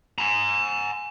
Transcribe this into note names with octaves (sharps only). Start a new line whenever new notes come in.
G#5 A#5